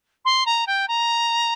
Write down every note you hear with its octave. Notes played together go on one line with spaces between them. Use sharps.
C6
A#5
G5
A#5